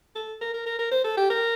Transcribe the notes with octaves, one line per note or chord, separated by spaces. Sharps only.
A4
A#4
A#4
A#4
A#4
C5
A4
G4
A#4